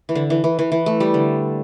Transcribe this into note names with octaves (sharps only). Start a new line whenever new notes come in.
E3
D3
E3
E3
E3
E3
A3
G3
D3